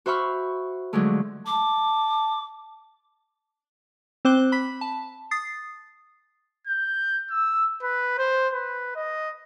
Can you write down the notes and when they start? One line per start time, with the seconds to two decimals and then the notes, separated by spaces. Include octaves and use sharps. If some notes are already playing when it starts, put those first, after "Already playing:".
0.06 F#4 C5 E5 B5 C#6 F6
0.93 D3 F3 F#3 G#3 A3
1.46 A5 D6
4.25 C4 C5 D6 F#6 G7
4.52 B5 B6
4.81 A5
5.31 D#6 A6 C7
6.67 G6
7.30 E6
7.83 B4
8.18 C5
8.53 B4
8.96 D#5